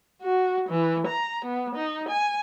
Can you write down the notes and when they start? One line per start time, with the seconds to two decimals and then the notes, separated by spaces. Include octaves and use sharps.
0.22 F#4
0.69 E3
1.07 A#5
1.45 B3
1.75 D#4
2.09 G#5